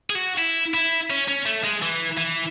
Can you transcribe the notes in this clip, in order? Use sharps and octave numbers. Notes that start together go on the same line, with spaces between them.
G#4
F#4
E4
E4
C#4
C#4
A3
G#3
E3
E3